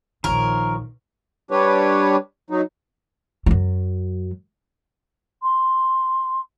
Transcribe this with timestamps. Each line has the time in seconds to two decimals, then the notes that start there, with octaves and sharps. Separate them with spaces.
0.24 A#1 D#2 D#3 F3 A#4 C#5
1.51 G3 D4 G4 B4 C#5
2.50 F#3 D#4
3.46 F#2 F#3
5.43 C6